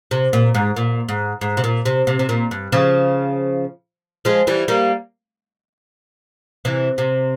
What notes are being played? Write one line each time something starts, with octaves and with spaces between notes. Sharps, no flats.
C3
A#2
G#2
A#2
G#2
G#2
C3
A#2
C3
C3
C3
A#2
G2
C#3 F3
F3 G#3
E3 G3
G3 A#3
C3 E3
C3